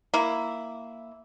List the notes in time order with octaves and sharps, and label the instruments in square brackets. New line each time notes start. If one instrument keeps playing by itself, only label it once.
[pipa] A#3 E4